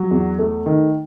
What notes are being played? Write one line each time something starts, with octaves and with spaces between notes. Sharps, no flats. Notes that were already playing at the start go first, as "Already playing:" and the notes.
Already playing: F#3
E2
A3
D#3